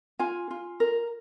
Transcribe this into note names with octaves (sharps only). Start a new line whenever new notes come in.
F4 G#5
F4
A#4